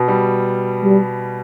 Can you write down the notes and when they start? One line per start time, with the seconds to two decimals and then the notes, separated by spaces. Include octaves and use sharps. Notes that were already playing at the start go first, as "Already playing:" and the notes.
Already playing: B2
0.08 G3
0.84 G3